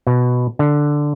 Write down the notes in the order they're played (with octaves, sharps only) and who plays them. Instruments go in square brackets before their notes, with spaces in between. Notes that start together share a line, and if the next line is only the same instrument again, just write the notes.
[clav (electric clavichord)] B2
D3